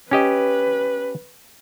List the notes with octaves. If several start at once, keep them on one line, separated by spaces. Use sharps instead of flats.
C#4 G4 B4 D#5